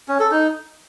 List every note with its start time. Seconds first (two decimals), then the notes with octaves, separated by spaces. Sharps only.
0.08 C#4
0.20 A4
0.31 D#4